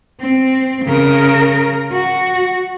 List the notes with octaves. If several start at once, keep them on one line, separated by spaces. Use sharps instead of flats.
C4
C#3 A#4
F#4